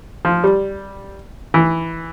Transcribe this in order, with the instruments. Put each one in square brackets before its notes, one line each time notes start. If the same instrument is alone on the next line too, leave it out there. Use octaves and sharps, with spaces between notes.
[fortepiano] F3
G3
E3